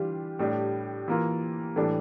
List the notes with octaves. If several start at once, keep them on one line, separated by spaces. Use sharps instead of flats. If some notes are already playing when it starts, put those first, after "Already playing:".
Already playing: E3 G3 D4 F4 G4
A2 G3 D4
E3 A#3 F4
A2 E3 G3 D4 A4